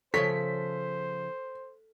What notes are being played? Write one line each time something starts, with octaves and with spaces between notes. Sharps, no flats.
C#3 F3 A4 C5 C#5 B6